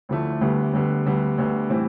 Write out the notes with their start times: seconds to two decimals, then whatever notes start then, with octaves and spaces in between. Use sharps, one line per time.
0.09 D2 D3 F3 A3 E4
0.41 D2 D3 G3 B3
0.73 D2 D3 G3 B3
1.06 D2 D3 G3 B3
1.38 D2 D3 G3 B3
1.70 A2 E3 G3 C4 E4